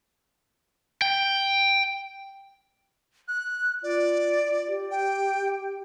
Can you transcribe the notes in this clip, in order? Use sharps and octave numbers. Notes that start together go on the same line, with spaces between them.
G5
F#6
F4 D5
G4
G5